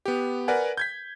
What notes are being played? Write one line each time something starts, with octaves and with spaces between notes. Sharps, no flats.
B3 G4
A#4 B4 D5 F#5 G#5
G6 G#6 B6